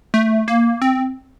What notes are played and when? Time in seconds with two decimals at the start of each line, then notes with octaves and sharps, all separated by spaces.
0.14 A3
0.48 A#3
0.82 C4